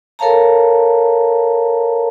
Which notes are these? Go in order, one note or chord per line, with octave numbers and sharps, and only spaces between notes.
A4 A#4 C#5 F5 A5 A#5